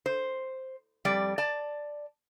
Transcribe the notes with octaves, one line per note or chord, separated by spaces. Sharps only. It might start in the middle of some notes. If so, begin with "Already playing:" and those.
C5
F2 G3 D5
D5 A5